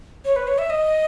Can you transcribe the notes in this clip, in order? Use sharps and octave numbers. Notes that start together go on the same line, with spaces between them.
C#5
B4
C#5
E5
D#5